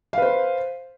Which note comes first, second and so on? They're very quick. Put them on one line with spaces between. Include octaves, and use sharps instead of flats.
F5 B4 C5